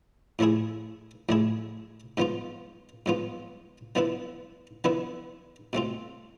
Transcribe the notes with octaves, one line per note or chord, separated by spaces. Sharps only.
A2 F3 A3 E4 G#4
A2 F3 A3 E4 G#4
G#2 F3 B3 F4
G#2 F3 B3 F4
D3 F3 B3 E4 B4
D3 F3 B3 E4 B4
B2 A3 C4 F4